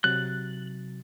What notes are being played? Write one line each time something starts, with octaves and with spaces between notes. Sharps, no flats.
C3 F#3 F#6 A6